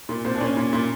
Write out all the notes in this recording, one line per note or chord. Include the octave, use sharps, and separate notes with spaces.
A#2
A#2 C4
D4
A#2 C#4
A#2
A#2